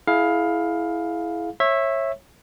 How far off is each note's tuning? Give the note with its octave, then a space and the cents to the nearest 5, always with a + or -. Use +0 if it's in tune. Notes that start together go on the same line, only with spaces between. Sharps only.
E4 +0 G#4 +30 F5 +15
C#5 -25 E5 +0